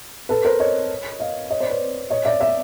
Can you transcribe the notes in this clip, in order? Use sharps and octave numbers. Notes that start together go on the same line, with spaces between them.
A4 B4
A#4 C5
C#5 D#5
D#5 F5
C#5 D#5
C5 D5
B4 C#5
C#5 D#5
D5 E5
D5 E5